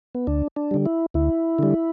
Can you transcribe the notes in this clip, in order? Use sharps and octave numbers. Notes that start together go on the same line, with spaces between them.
B3
D2 D4
D4
D3 G3
E4
D2 E4
D3 G3